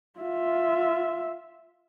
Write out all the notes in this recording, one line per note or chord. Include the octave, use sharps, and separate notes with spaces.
F4 E5